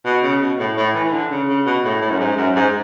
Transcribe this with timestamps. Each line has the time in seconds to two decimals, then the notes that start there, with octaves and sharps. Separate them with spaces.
0.05 B2
0.23 C#3
0.41 B2
0.59 A2
0.77 A2
0.94 E3
1.05 E3
1.13 D3
1.30 C#3
1.48 C#3
1.66 B2
1.84 A2
2.01 A2
2.10 F#2
2.20 G#2
2.37 F#2
2.56 G#2